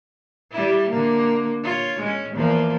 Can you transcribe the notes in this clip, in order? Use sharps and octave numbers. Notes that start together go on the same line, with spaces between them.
G3 E4
D3 A#3
F4 C#5
G#3 C#4
E2 F3 A#3